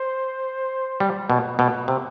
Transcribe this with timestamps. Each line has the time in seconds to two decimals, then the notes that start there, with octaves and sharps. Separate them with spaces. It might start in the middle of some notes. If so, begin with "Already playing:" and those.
Already playing: C5
1.00 G3
1.30 B2
1.59 B2
1.88 C3